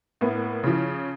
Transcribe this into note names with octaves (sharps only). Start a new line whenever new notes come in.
A2 A#3 B3
C#3 F3